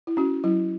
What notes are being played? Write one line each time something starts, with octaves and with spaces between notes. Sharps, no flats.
E4
C#4 F#4
F#3 E4